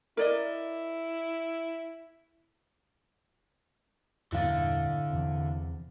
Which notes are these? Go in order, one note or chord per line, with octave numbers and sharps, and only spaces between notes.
E4 A#4 D5 D#5
E2 G2 A#2 D3 E4 F5 A6
E2 C3